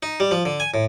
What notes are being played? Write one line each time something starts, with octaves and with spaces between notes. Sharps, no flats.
D#4
G3
F3
D3
G#5
A2